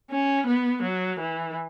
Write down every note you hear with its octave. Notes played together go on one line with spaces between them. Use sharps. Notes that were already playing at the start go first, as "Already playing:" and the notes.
C#4
B3
F#3
E3